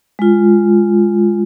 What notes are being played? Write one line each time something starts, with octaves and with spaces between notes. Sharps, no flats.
G#3 F4